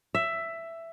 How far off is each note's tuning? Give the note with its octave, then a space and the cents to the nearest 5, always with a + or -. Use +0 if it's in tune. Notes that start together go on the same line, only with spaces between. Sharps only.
E5 +10